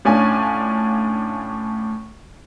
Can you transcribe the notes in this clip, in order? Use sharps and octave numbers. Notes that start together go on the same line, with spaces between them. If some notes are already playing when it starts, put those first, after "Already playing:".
A2 C#4 D4 F4 G#5